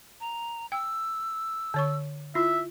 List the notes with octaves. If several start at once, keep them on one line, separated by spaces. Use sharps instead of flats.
A#5
G5 E6
D3 C#5 C#6
E4 F4 E5